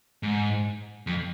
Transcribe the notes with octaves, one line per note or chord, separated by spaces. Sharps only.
G#2
F2